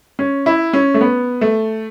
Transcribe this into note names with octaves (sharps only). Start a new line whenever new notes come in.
C#4
E4
C#4
A3
B3
A3